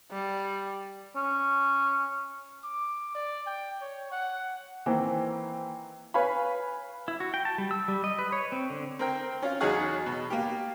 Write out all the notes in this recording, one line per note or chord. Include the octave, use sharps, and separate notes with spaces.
G3
C#4
D6
D5
G5
C#5
F#5
D#3 E3 A#3 C4
B4 C#5 F5 G#5 B5
E4
F#4
G5
A5
G3
E6
G3
D#5
B4
C#5
C4
D3
C4 A#4 G5
C#4 F4
E2 F#3 D#4 G#4 F#5 C#6
B2
A#3 G4